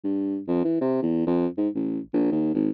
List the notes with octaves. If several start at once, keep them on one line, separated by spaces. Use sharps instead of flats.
G2
F2
E3
C3
E2
F2
G#2
A1
A#1
D#2
G#1